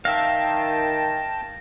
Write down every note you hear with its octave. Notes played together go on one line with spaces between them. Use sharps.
D#3 E5 F5 G5 A5 A#6